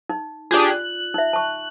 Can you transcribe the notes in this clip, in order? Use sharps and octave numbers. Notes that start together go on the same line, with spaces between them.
D#4
D4 F4 G4 G#4 D5
F#6
D#4 E5
A5 C#6